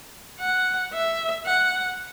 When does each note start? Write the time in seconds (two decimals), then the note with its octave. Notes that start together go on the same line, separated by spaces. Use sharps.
0.40 F#5
0.93 E5
1.46 F#5